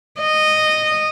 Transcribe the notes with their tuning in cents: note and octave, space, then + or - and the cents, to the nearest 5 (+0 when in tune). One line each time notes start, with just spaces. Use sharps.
D#5 -10